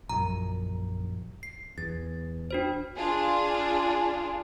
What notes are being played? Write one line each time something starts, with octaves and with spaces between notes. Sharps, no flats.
A#1 F#2 A#5
C7
E2 A6
D4 F#4 C5
D4 F4 G#4